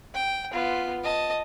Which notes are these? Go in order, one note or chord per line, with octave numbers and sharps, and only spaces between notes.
G5
B3 F4
D#5 A5